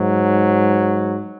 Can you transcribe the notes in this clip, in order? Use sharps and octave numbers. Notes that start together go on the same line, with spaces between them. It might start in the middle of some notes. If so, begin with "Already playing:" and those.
Already playing: G#2 F#3